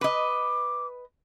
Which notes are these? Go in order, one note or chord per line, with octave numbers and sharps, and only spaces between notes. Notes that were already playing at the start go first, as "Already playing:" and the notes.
B4 D#5 D6